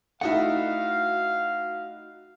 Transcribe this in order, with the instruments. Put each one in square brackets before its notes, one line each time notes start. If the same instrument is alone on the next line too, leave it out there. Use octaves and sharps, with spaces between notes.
[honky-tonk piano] A3 D#4 E4 [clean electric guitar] F#4 F#5 [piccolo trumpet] F5